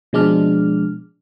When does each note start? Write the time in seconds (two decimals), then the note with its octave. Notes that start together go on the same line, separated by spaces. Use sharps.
0.13 B2 F3 G#3 D4 D5 F6